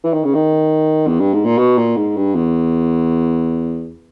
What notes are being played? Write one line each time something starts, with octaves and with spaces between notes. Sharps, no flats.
E3
D#3
C#3
D#3
E2
G2
G#2
A#2
B2
A#2
G#2
G2
E2